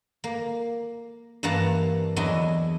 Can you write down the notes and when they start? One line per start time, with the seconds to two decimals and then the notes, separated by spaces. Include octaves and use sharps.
0.24 A#3
1.43 G2 E3 A#3 F#5 A5 A#5
2.16 E2 F#3 D4 E4 D#5 G#5